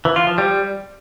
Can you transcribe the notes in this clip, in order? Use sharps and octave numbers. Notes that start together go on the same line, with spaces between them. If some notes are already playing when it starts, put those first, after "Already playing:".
E3
F4
F3
G3